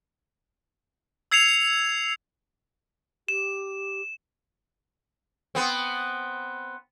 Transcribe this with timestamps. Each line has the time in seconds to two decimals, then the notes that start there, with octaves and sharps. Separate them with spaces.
1.31 E6 G#6 C7 C#7 F7
3.28 G4 E7
5.55 B3 C4